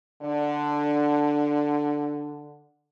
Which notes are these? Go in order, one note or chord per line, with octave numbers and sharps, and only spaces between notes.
D3 D4